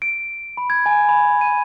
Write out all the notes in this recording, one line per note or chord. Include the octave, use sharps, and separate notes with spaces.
D7
B5
G#6
G#5
B5
D#7